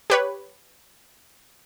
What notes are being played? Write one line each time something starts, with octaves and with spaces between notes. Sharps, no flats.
G4 B4 C#5